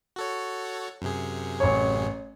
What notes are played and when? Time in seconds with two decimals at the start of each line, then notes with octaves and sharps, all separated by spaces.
0.16 F#4 A4 C#5
1.02 F#2 C3 G#4
1.60 A1 C#5